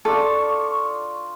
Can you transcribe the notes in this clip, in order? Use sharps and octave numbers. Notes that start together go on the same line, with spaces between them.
D4 F4 A4 F5 C#6